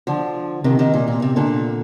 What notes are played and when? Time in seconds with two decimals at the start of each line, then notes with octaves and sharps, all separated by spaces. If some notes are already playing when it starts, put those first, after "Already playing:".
0.07 D3 F3
0.64 C3 D#3
0.79 C3 D#3
0.94 A#2
1.08 A#2
1.22 C3
1.36 A#2 D3